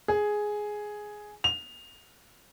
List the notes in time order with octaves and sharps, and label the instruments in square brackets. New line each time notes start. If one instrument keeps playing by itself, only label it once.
[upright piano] G#4
F7